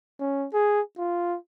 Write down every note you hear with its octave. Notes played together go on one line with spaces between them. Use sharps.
C#4
G#4
F4